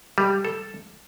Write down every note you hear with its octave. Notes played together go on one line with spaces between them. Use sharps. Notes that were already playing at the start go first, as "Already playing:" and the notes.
G3
A4